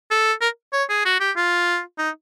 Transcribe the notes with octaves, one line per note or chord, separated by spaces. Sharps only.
A4
A#4
C#5
G#4
F#4
G4
F4
D#4